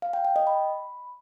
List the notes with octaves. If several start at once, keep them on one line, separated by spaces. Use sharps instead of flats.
F5
G5
G5
D#5
B5